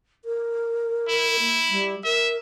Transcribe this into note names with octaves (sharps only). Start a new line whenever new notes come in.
A#4
E4
A#3
G3
A#4 E5